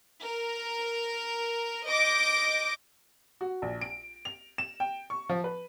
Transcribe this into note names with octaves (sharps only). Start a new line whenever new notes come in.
A#4
D#5 D6 G6 A#6 D7
F#4
A#1
D7
F7
E7
G5
C#6
F3
B4